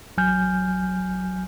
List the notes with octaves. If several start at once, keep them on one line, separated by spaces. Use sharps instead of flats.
A1 F#3 G#5 F6 G6